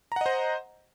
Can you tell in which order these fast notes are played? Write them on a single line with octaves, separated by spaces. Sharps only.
A#5 F#5 D#5 C5